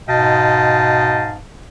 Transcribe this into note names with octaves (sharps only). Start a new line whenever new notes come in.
G#2 B2 D#5 F5 G5 A5